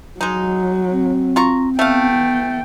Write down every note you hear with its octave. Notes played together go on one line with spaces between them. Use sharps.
F#3 G#3 D#4
C4
F4 A#5 C#6
A3 B3 F5 G5